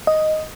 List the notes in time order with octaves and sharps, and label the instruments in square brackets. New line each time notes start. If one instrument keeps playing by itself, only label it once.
[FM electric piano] D#5